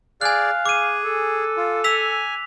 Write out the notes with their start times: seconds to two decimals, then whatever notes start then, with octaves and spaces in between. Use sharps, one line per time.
0.21 G#4 D5 F5 G#5 F#6
0.66 G#4 D6 D#7
1.04 A4
1.57 F4
1.84 G#5 E6 B6 F7